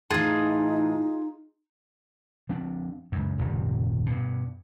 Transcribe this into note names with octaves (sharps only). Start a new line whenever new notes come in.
A2 E3 D#4 F4 G#4
F3 C4 D4
C#2 F#2
D#1 C#2 F#2 C3
G2 B2